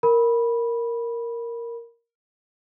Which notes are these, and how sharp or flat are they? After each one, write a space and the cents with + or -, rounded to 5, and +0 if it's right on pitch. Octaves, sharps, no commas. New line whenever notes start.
A#4 +0 B5 -15